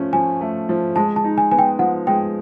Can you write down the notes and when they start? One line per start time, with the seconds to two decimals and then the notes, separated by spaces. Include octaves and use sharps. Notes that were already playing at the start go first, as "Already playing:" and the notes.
Already playing: F3 A3 C#4
0.13 F3 G#5
0.41 A3
0.69 F3
0.96 G#3 A5
1.16 A5
1.24 D#4
1.38 G#5
1.51 B3 G#5
1.59 G5
1.79 F3 F#5
2.07 G#3 G5